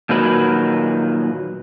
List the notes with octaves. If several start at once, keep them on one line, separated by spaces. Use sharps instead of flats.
A#2 D#3 F#3 B4